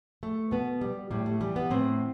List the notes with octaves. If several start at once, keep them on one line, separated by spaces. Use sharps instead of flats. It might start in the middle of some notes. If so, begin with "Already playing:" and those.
A3
B2 B3
G3
A2 G3
A3
E3 G3
B3
A2 C4